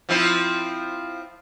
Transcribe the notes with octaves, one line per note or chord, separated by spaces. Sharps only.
F3 C4 E4